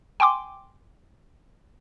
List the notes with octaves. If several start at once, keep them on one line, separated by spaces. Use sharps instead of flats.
G5 G#5 C6 D6